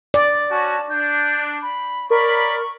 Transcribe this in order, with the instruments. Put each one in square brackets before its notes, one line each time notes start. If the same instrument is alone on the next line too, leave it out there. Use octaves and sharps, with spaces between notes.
[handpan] D5
[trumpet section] C#4 F#4 [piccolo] A5
[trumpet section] D4 [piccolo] G6
[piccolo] B5
[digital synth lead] A#4 [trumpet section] C#5 D5 B5 [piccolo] C#6